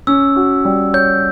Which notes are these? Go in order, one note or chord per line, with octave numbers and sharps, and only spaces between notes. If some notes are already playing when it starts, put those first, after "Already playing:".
C#4 E6
F#4
G3
C#5 G6